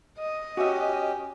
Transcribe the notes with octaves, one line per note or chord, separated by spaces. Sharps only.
D#5
C#4 F#4 G4 E5